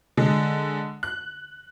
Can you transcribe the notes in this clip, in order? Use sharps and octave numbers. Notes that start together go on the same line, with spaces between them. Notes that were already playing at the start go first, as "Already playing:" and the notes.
D3 G#3
F#6